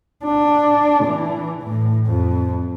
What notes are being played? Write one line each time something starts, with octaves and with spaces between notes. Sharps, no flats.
D4
E3
A2
F2